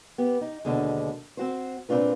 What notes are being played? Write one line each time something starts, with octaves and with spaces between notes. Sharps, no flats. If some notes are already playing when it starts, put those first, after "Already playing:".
B3 G4
D#4
D#2 B2 D3 G#3
C4 F#4 C5
A#2 C4 D4 F4 B4